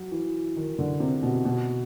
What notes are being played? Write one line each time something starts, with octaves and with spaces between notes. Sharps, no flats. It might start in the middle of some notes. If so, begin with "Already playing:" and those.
Already playing: F#3
E3
D#3
D3
C3
B2
B2